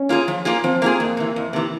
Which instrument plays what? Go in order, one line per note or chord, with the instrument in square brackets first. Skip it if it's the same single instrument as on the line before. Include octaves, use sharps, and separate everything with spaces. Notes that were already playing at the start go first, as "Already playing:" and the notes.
Already playing: [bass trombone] C#4
[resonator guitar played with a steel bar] A#3 F4 G#4
F3
A#3 F4 G#4
[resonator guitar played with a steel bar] F3 [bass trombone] C4
[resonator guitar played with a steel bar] A#3 F4 G#4
[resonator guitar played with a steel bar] F2 [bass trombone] A#3
[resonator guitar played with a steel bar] C3 E3
F2
C3 E3